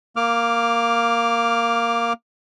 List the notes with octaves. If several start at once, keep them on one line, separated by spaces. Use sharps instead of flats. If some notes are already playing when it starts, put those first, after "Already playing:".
A#3 D6 F6